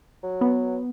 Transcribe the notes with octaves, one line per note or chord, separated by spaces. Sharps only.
F#3
B3